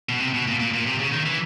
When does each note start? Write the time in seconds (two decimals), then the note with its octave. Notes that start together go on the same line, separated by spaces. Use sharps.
0.09 B2
0.20 C3
0.34 B2
0.47 A#2
0.59 A#2
0.73 A#2
0.86 C3
0.99 C#3
1.12 D#3
1.25 E3